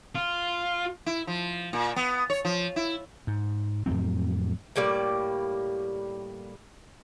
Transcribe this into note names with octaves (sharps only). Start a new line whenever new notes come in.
F4
E4
F3
A#2
B3
C#5
F3
E4
G#2
F2 A2 F#3 C4
A2 G3 A#3 D5